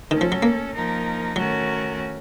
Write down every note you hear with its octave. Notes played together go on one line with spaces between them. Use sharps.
D#3 A3 C#4 A4
F3
F#3
A#3
F3 A#3 D#4 A#4
D#3 F#3 A3 C#4 F#4 A#4